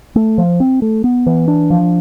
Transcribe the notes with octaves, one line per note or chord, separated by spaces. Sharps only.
A3
F3
C4
A3
B3
E3
D4
F3